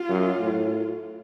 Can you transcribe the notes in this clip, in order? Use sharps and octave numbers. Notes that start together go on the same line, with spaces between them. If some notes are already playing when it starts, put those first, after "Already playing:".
Already playing: F4
F#2
A2